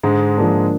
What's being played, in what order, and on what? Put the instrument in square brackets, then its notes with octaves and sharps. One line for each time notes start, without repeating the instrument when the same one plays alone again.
[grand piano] G#2 G#3 [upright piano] D3
[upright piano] F3 A#3 D4